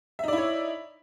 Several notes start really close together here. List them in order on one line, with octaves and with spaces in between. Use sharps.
E5 D#4 D5 E4 C#5